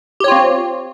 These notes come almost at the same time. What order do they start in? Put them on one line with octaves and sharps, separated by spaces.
G4 C#5 F4 C4